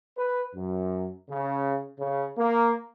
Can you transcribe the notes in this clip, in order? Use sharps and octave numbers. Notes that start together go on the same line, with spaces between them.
B4
F#2
C#3
C#3
A#3